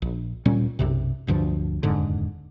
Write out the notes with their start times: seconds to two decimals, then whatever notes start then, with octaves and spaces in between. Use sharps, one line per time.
0.02 A#1
0.45 D1 A#2 G3 C#4
0.79 B1 F#2 C3
1.27 D1 D2 G2 F3
1.83 D#1 F2 G#2 D3